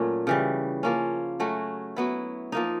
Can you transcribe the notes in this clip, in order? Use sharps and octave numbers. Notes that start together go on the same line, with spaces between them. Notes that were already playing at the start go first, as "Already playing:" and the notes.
Already playing: A#2 F#3 A3 C#4
C#3 E3 G3
F3 A#3 C#4
F#3 A3 C#4 F#4
F#3 B3 E4
F3 A#3 D#4